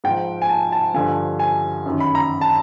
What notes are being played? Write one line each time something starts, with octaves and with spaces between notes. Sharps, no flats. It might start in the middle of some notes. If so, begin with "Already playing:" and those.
G#2 F3 G5
G#5
A5
A5
G2 D3 F3 G#5
G#5
F#2 D#3
B5
A#5
A5